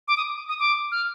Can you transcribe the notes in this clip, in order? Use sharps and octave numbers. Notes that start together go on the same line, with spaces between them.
D6
D#6
D#6
D6
F6